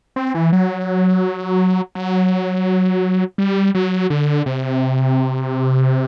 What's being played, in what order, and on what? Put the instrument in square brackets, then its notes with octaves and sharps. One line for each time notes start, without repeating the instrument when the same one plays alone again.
[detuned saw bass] C4
E3
F#3
F#3
G3
F#3
D3
C3